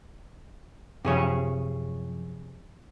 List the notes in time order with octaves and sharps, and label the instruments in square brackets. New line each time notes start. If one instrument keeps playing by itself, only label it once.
[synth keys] F#2 F3 [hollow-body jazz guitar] C3 G#4 C#5